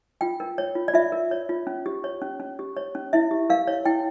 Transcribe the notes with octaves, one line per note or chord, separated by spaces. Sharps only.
F4 G5
A#4
C#5
F4
D5
F4 E5
A#4
C#5
F4
C#4
G4
C#5
C#4
C#4
G4
C#5
C#4
E4 E5
G4
A#4 F5
C#5
E4 G5